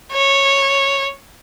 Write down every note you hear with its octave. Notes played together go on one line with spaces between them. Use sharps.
C#5